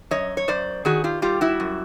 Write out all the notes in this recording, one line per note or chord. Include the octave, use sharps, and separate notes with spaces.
F#2 C#5 D#5
C#5
F#2 C5 D5
D#3 F#4 G#4
F4 G4
G3 F4 G4
E4 F#4
F#2